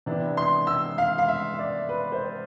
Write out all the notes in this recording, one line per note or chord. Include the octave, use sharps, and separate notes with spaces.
C3 E3 B3 D4
C6
E6
F5
F5
E5
E5
D5
B4
C5